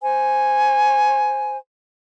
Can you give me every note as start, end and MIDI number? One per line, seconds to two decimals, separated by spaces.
0.02 1.56 72
0.02 1.56 80